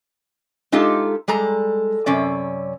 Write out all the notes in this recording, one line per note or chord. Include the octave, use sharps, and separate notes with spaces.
G#3 D#4 F4 G4 A4
G3 G#3 A4 A#5
F#2 C3 C#4 D5